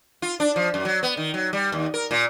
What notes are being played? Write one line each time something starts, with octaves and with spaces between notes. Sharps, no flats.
F4
D4
F3
F#2
F#3
B3
D#3
F#3
G3
D#2
A#4
A#2